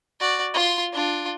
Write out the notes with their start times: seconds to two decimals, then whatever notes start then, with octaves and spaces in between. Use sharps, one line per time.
0.20 F#4 D5
0.54 F4 C6
0.93 D4 F4